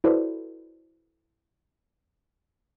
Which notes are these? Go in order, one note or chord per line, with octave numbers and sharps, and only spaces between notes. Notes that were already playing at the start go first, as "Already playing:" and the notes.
E4 F#4 A4 B4 C5 D5